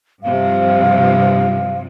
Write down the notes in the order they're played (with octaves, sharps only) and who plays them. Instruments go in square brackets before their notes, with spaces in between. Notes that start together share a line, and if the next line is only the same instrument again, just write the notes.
[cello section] G2 C3 F3 [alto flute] F5